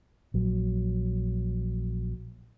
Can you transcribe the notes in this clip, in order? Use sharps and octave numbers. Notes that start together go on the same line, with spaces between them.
A#1 F#3